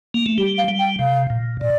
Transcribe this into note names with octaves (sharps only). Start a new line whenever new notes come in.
A#3
A3
G3 G4
F5
G3
G5
C3 F5
A#2
A#2 D5